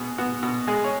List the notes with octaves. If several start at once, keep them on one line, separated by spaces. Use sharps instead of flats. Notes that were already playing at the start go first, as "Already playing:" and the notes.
Already playing: B2 B3 G#4
B3 F#4
B2
G#3 G#4
C#5